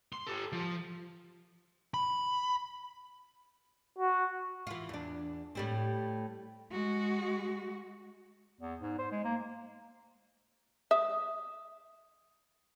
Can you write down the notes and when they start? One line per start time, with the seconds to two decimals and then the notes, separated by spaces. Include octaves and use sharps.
0.13 C6
0.27 G4 A4
0.53 F3
1.94 B5
3.99 F#4
4.67 E3 F4
4.89 E2 D4
5.55 A2 G3 C4
6.72 G#3 F#4
8.61 E2
8.81 G#2
8.99 C5
9.12 G#3
9.24 A#3
10.91 E5 D#6